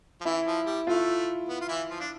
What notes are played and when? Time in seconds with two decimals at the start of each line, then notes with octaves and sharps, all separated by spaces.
0.21 F3
0.25 E3 E4
0.46 F3
0.66 G3
0.87 A3 F4
1.48 B3
1.61 F4
1.69 E3 E4
1.89 F3 F4
2.00 D4